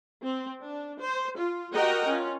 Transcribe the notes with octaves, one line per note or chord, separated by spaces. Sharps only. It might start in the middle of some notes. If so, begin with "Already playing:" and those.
C4
D4
C5
F4
F#4 G4 A#4 D#5 F#5 G5
C#4 F4